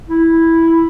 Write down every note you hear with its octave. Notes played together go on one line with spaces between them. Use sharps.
E4